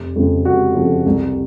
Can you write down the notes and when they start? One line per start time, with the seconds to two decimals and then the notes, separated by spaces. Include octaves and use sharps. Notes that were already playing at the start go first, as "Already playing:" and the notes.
Already playing: F1
0.16 F2 C#3 F3
0.45 F1 F#4
0.75 F2 C#3 F3
1.06 C2